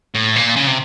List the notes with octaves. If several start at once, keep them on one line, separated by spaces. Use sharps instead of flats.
A2
A#2
C#3
C3